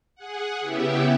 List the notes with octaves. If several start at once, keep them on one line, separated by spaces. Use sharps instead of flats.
G#4 F#5
C#3 B3 E4 G4 E5